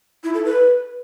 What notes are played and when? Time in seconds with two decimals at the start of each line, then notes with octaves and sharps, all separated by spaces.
0.24 E4
0.34 A4
0.45 B4